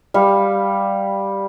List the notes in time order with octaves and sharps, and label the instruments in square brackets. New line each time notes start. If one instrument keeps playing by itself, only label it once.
[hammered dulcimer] G3 F5